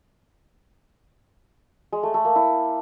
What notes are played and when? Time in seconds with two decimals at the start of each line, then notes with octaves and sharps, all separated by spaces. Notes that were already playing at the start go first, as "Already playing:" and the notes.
1.92 G#3
2.03 A3
2.14 A3
2.25 A#3
2.36 E4